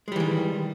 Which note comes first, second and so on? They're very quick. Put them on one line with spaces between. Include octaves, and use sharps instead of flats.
G#3 G3 E3 D#3